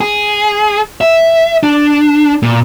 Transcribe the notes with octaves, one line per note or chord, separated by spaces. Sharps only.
G#4
E5
D4
A#2